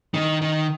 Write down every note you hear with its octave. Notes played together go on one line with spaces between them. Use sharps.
D#3
D#3